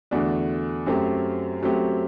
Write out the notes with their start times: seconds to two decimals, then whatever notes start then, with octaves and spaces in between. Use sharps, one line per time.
0.11 E2 D3 A3 D4 F#4
0.86 F#2 F#3 A3 C4 G4
1.62 F#2 F#3 A3 C4 G4